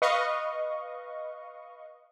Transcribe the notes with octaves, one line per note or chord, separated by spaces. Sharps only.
B4 D#5 F5 C#6